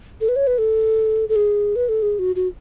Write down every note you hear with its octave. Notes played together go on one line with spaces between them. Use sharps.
A4
B4
C#5
B4
A4
A4
G#4
B4
A4
G#4
F#4
F#4